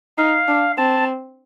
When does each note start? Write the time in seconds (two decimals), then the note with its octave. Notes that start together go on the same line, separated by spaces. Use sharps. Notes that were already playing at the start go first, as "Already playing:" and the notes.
0.18 D#4 F5
0.48 D4
0.78 C4 A5